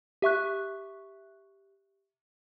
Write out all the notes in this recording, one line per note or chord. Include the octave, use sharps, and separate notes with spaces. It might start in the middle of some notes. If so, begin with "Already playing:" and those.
G4 E5 C#6 F#6